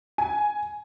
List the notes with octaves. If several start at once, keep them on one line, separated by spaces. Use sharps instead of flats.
G#5